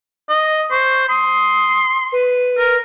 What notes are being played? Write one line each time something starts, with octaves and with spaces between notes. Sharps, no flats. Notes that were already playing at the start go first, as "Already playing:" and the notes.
D#5
C5 C#6
C6 D#6
B4
A#4